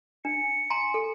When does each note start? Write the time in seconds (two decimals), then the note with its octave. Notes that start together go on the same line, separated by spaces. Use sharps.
0.25 D4 C#7
0.70 G#5 A#5 C6
0.94 A4